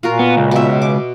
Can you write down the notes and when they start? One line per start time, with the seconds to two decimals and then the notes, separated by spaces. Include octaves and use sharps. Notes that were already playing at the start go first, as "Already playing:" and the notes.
0.03 A#2 F4 F#4 A#4
0.19 B3
0.37 C#2
0.51 B2 E5
0.82 D6